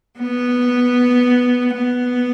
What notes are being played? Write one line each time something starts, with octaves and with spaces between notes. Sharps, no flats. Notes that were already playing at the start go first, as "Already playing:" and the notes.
B3
B3